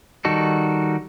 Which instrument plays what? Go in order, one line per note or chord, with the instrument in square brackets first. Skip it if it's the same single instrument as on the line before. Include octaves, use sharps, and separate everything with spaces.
[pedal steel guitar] D#3 G3 D#4 F#4 A4